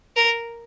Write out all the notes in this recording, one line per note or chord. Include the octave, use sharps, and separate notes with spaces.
A#4